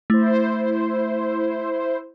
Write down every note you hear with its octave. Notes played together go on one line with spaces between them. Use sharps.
A3 E4 C5